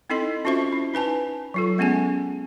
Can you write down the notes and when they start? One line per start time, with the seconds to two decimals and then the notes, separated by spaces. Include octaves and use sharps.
0.10 C4 D#4 E4 A4 D#5 C6
0.45 C#4 F4 F#4 C5 E5 C#6
0.72 E4
0.94 D#4 B4 G#5 A5
1.54 F#3 F4 A4
1.78 G#3 B3 C#4 G#4 G#5